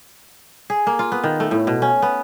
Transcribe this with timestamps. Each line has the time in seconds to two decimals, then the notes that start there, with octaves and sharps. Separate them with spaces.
0.70 G#4
0.87 A#3
0.99 F4
1.12 B3
1.24 D#3
1.40 A3
1.51 A2
1.67 B2
1.82 C#4
2.02 B3